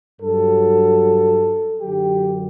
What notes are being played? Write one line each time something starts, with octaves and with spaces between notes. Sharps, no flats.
G2 F#3 A4
F#2 D3 F#3 G4